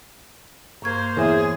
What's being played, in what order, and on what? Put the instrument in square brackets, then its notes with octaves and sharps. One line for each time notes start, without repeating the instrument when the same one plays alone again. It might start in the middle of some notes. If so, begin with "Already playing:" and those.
[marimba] G2 C#6 G#6 [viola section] A#3 C5
[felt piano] E2 [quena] G#4 [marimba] C#5 E5